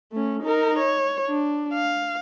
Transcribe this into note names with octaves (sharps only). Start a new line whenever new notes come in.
A3 C#4
D#4 A#4
C#5
D4
F5